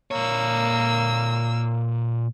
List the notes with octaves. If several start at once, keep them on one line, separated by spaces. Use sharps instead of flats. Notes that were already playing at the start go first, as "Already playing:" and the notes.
A#2 A#3 C#5 E6